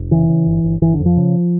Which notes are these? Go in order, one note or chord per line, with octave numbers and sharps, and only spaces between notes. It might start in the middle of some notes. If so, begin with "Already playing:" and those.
Already playing: F1
C#3 E3
C#3
G1
G1
G1 E3
D3
F2
F3
C#3